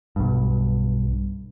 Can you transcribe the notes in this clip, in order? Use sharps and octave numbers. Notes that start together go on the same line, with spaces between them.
B1 G2